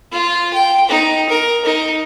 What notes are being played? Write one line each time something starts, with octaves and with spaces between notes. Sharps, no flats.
F4
G5
D#4
A#4
D#4